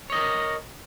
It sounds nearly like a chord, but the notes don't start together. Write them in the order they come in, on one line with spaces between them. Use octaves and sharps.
C#5 D#5 A#4